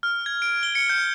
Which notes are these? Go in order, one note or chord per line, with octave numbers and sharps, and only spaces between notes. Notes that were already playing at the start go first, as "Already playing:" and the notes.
F6
G#6
D7
G7
C#7
G6